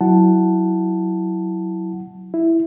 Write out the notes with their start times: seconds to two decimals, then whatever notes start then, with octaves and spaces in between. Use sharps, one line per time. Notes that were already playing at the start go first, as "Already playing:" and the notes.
0.01 F#3 E4 F#5 A5
2.34 E4